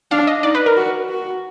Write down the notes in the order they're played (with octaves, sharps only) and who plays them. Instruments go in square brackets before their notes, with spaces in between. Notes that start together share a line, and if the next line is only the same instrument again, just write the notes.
[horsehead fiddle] D4 [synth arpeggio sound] F5
[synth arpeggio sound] D#5
[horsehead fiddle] D#4 [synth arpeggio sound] D5
[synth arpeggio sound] B4
A#4
[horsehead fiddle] F#4
F#4